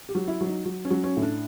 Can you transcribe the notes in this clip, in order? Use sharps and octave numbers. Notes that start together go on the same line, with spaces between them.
G4
F#3
E4
F#3
D#4
F#3
C#4
F#3
C#4
A2
D4